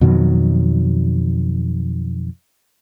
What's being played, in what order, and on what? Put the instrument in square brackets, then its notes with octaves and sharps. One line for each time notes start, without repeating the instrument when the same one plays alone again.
[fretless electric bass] F2 B2 D#3 F#3